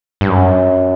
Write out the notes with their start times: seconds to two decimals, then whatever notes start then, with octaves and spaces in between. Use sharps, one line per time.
0.21 G2
0.29 F#2